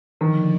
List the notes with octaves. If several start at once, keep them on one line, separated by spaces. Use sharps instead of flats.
F2 D3 D#3 F3 A#3 D4